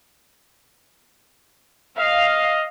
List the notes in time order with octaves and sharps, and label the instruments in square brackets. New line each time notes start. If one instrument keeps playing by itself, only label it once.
[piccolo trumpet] D#5 [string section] F5